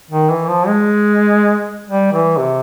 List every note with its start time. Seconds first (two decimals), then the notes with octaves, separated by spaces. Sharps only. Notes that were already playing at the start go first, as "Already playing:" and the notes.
0.11 D#3
0.30 E3
0.48 F3
0.67 G#3
1.87 G3
2.12 E3
2.37 C3